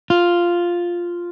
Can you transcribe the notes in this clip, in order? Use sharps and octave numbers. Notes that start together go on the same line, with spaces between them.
F4